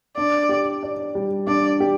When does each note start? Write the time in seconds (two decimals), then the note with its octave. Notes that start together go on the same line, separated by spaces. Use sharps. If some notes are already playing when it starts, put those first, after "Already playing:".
0.17 D4 D5
0.49 G4
0.83 D5
1.15 G3
1.47 D4 D5
1.80 G4